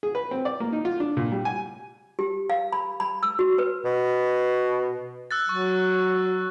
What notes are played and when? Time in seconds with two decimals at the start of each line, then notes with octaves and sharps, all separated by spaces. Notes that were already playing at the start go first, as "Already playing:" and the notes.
0.03 G#4
0.15 B4
0.31 C4
0.45 D5
0.60 A#3
0.72 D#4
0.85 F4
1.00 D4
1.17 A#2
1.32 G3
1.45 G#5
2.19 G4
2.50 F5
2.72 B5
3.00 B5
3.23 E6
3.39 F#4
3.58 B4
3.85 B2
5.31 E6 F#6 A6
5.49 F#3 C#6